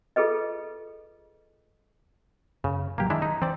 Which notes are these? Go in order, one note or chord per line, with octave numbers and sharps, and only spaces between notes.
F4 G#4 A4 B4 D#5
F#2 C#3
A1 D#3 F#3 A#3 G4
D#3 G#3 D4 E4
D#4
E3 C4 D5